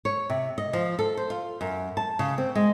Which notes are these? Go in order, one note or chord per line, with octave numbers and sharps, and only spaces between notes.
C#5
C3
D#5
F3
A4
C5
F4
F#2
A5
C#3
C4
G#3